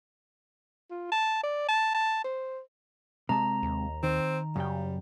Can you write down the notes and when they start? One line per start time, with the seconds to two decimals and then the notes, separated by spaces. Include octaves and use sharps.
0.91 F4
1.12 A5
1.43 D5
1.69 A5
1.95 A5
2.24 C5
3.29 C3 G#3 A5 A#5
3.63 D#2
4.03 D#3 C4
4.56 F#2 C#3 G3 G5